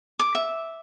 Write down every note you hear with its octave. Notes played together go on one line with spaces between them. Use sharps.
D6
E5